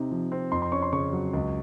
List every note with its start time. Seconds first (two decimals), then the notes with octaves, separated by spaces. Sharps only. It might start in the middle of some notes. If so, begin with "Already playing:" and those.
Already playing: C3 C4 D#4
0.11 F3
0.32 C4
0.52 F2 C6
0.62 C6
0.72 C#4 C#6
0.82 C6
0.93 C#3 C#6
1.13 F#3
1.33 C#2